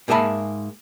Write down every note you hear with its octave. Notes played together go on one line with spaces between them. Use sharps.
G#2 A#3 G#4 E5 A5 B5